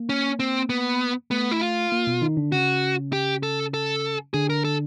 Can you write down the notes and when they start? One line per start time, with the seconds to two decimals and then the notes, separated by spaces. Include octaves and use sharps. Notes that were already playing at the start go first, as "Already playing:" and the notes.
Already playing: A#3
0.09 C#4
0.40 C4
0.70 B3
1.31 A3 B3
1.52 E4
1.61 F4
1.92 A#3
2.07 B2 B3
2.22 D#3 D#4
2.37 D3 D4
2.52 C#3 C#4 F#4
3.13 G4
3.43 A4
3.74 A4
4.34 D3 D4 G#4
4.50 A#4
4.65 A4